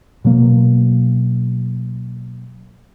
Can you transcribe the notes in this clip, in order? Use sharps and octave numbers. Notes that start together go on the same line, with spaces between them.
B2 F#3 A#3